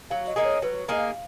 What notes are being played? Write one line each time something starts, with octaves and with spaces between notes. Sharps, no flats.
F#3 F5
D#5
A#3 D#4 G#4
C#5
F#3 B4
A#3 D#4 G#4 D#5
F5